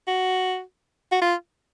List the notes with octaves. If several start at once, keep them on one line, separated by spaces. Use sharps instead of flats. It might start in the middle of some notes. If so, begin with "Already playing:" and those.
F#4
F#4
F4